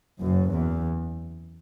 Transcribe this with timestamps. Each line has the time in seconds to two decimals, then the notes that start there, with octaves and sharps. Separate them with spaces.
0.21 F#1 F#2
0.52 E2